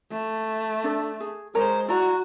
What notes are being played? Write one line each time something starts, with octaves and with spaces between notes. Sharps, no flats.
A3
D4 A4
G#4
G#3 A#4 C5 C#5 A#5
E4 F#4 D5 A#5